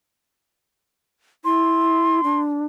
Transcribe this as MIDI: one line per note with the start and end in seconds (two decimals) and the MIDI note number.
1.45 2.20 64
1.45 2.40 84
2.24 2.66 62